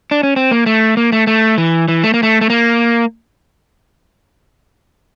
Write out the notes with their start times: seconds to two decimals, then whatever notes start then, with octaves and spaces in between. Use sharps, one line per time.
0.11 D4
0.23 C#4
0.36 C4
0.51 A#3
0.66 A3
0.97 A#3
1.12 A3
1.27 A3
1.58 E3
1.88 E3
2.03 A3
2.14 A#3
2.23 A3
2.41 A3
2.50 A#3